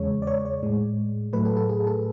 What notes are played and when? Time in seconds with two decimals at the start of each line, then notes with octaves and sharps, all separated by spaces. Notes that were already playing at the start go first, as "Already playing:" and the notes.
Already playing: E2 C#3 G#3 C#5
0.22 D5
0.27 C#5
0.45 C#5
0.63 A2 G#3
1.33 A2 F#3 A3 B4
1.45 A4
1.57 A4
1.69 G#4
1.87 A4